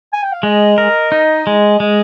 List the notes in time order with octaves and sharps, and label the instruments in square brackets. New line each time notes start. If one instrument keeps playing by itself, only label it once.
[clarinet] G#5
G5
F5
[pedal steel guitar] G#3 [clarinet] D#5
[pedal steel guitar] A#4
D#4
G#3
[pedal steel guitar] G#3 [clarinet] D#5